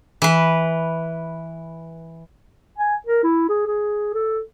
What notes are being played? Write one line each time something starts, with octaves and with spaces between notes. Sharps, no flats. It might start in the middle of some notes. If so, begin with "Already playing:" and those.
E3 B4
G#5
A#4
E4
G#4
G#4
A4